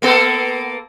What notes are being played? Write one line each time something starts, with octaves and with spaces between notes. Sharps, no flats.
A#3 B3 A4